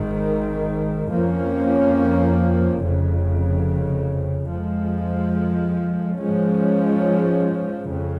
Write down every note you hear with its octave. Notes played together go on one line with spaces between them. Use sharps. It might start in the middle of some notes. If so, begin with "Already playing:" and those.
Already playing: G#1 G#2 D#3
F2 F3 A#3 C#4
F1 F2 C#3
F2 F3 G#3
G#2 F3 G#3 C#4
F2 C#3